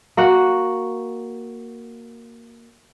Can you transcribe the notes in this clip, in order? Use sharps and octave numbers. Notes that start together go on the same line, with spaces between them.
A#3 F#4 F#5